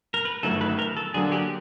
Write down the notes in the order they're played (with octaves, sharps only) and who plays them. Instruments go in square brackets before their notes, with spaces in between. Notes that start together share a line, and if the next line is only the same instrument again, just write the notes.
[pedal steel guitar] A#4
B4
[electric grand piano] G1 F#2 D#3 F#3 A3 [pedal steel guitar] A4
[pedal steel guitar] B4
A#4
A4
[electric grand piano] D3 F#3 A#3 D4 [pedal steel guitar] G#4
[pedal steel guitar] G4